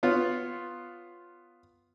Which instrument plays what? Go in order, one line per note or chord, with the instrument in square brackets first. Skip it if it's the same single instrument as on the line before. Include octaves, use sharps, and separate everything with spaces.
[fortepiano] B3 F4 C#5